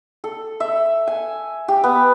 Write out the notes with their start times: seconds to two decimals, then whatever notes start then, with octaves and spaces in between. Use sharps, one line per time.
0.24 A4
0.60 E5
1.07 G#5
1.68 G4
1.84 B3